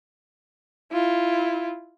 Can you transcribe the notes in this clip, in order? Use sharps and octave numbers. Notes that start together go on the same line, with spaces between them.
E4 F4